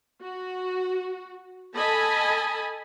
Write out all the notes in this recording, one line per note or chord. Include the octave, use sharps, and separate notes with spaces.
F#4
A4 D#5 G#5 A5 B5